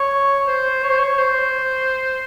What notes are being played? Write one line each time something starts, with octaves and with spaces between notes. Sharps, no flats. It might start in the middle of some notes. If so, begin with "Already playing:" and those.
Already playing: C#5
C5
C#5
C5
C#5
C5